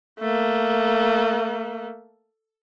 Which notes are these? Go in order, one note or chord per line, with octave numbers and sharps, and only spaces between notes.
A3 A#3